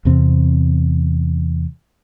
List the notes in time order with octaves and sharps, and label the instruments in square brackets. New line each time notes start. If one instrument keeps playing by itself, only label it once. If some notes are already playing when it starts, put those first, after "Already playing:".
[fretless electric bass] E2 C3 C4